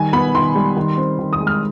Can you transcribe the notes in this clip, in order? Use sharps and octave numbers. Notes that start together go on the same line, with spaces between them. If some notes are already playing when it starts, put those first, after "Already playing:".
Already playing: D#3 G3 G#5
B3 B5
D#3 C6
G3
D#3
C4
D#3
D#6
G#3
F6